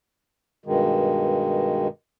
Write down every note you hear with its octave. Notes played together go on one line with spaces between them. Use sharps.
G2 B2 D#3 G#3